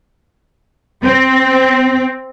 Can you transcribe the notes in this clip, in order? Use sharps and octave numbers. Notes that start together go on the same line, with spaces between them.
C4